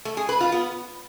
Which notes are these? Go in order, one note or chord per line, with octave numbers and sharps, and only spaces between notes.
A3
G#4
B4
F4
B3